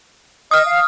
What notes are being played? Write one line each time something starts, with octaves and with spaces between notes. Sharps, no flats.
D#5 D#6 F6
F5